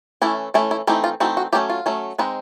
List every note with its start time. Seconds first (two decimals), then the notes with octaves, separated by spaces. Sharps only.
0.22 E3 A3 C#4 E4
0.54 E3 A3 C#4 E4
0.71 E4
0.87 E3 A3 C4 D#4 E4
1.04 F4
1.20 E3 A3 C4 D#4 F#4
1.37 F#4
1.53 F#3 A3 C#4 G4
1.70 F4
1.86 F#3 A3 C#4
2.18 G#3 C4 D#4 B4